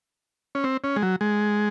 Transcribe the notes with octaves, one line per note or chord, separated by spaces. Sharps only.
C#4
C4
C#4
G#3
F#3
G#3